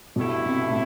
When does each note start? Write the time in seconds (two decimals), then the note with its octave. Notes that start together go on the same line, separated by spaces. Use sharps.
0.16 G2 B2 D3 A3 E4
0.46 C3
0.69 A2